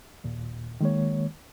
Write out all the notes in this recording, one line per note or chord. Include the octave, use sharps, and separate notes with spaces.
D#2 A#2
D#3 G#3 A#3 C#5